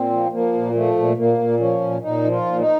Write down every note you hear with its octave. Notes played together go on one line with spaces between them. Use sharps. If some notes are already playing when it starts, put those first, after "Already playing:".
Already playing: A#2 C4
F3
F3 A#3
A#2
F3 A3
A#2
A#2 A#3
A#2
F3 C#4
A#2
A#2 D#4
F3
F4
A#2
D#4